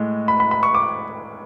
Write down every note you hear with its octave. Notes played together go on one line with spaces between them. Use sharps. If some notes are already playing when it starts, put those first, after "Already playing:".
Already playing: A2 G#3
B5
B5
B5
C#6
D6